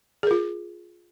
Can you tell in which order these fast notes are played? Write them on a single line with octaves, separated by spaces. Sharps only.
G#4 A#4 F4